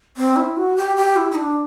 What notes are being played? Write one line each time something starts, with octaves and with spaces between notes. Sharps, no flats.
C4
E4
F#4
G4
G4
E4
E4
D4